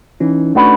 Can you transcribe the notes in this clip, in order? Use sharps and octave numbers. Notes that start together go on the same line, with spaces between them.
E3 C#4 D#4
A3 D4 F#4 B4